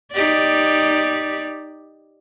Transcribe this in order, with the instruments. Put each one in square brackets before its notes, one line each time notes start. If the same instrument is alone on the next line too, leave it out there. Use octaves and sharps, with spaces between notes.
[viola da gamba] D#4 G4 D5